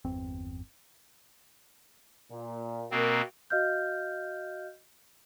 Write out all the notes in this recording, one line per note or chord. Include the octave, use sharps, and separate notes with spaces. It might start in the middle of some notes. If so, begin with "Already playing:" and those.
G1 E2 C4
A#2
B2 A#3 C4 A#4
F#4 D#5 F5 F6 G6